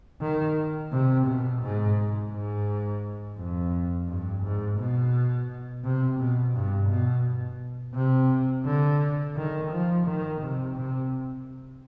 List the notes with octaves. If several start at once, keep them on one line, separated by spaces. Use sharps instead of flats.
D#3
C3
B2
G#2
G#2
F2
G2
G#2
B2
C3
B2
G2
B2
C3
D3
D#3
F3
D#3
C3
C3